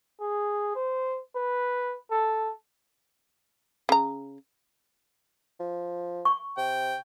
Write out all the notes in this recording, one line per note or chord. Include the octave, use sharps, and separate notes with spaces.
G#4
C5
B4
A4
C#3 A#5
F3
C#6
C3 G5